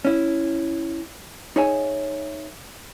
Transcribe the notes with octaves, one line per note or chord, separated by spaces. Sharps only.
C#4 E4
D#4 G#4 C#5 E5 G#5